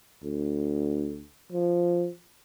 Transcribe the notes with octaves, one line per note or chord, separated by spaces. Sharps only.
D2
F3